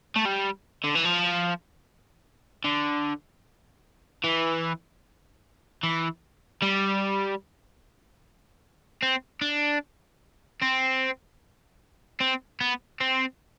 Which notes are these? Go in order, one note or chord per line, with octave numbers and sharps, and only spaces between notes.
A3
G3
D3
E3
F3
D3
E3
E3
G3
C4
D4
C4
C4
B3
C4